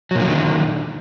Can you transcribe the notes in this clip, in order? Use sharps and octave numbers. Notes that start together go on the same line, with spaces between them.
A#2 D3 D#3 F3 F#3